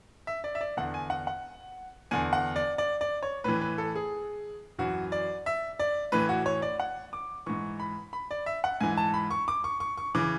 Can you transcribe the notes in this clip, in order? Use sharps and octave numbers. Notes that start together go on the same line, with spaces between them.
E5
D5
E5
D5
E2 D3 F#5
G#5
F#5
F#5
E2 D3 G#5
F#5
D5
D5
D5
C#5
A2 E3 B4
B4
A4
G#4
F#2 E3 F#4
D5
E5
D5
A2 E3 B4
F#4
C#5
D5
F#5
D6
G#2 E3 C#6
B5
B5
D5
E5
F#5
G#2 E3 G#5
A5
B5
C#6
D6
C#6
C#6
C#6
C#3 E3 D6